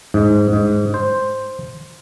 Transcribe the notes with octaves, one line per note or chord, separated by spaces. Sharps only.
G#2
G#2
C5